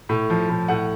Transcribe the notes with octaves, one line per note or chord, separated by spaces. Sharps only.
A2
F3
A2
A2 F#5